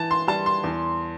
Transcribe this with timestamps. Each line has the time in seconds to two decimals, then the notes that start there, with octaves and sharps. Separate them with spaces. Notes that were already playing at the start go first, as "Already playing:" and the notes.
Already playing: E3 A5
0.11 C6
0.27 G3 A5
0.46 C6
0.64 E2